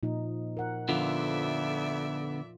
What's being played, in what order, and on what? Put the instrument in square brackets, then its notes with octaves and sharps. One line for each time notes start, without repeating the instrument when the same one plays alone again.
[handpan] A#2 F3 D#4
A#4 F#5
[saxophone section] F2 D5 E5 [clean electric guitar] D3 B3 [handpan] F3 F4